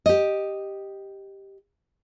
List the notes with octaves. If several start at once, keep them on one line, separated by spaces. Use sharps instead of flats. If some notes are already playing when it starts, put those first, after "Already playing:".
G4 D#5